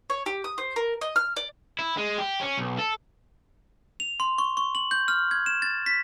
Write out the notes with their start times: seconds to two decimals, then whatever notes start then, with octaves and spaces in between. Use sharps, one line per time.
0.10 C#5
0.26 G4
0.44 D#6
0.58 C5
0.76 A#4
1.01 D#5
1.16 F6
1.37 D5
1.79 E4
1.97 G#3
2.18 G4
2.41 C#4
2.57 B1
2.79 A4
4.00 F7
4.20 C6
4.38 C#6
4.57 C#6
4.75 F#7
4.91 G6
5.08 F6
5.31 G#6
5.46 E7
5.62 A6
5.86 B6